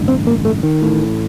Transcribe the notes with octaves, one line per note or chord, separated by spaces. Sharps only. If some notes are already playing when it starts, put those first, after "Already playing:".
Already playing: A1 G2 D3
C4
A#3
A3
D#3
A1 A2